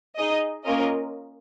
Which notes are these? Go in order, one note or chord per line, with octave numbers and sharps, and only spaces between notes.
D#4 G#4 D#5
A#3 C#4 F4 A#4 D#5